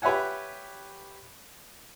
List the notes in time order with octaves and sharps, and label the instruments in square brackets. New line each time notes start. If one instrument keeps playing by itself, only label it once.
[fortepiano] G4 B4 C#5 E5 F#5 G#5